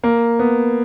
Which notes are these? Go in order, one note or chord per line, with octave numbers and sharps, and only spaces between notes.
A#3
B3